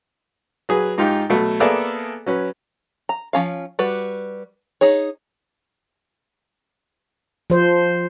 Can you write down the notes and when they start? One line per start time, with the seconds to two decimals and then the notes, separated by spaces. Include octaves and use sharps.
0.69 F#3 G#4 B4
0.98 G#2 D#4 F4 G4
1.30 B2 F#3 A3
1.60 A#3 B3 G#4 A4 D5 E5
2.27 F#3 C#4 B4
3.09 A#5
3.33 F3 C#4 F5
3.79 G3 F#4 B4
4.81 D#4 G#4 C#5
7.50 F3 C5